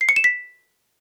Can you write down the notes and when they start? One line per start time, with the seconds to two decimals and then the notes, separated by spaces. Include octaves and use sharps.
0.01 C7
0.09 C#7
0.16 E7
0.24 B6